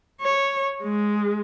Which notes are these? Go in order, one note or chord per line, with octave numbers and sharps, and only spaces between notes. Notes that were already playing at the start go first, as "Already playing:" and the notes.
C#5
G#3